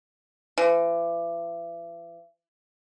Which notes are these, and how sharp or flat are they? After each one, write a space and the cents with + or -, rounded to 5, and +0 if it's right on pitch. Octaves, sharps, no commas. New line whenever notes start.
E3 +40